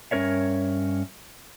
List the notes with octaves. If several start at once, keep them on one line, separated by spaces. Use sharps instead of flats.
G2 C#4 A#4 C#5 E5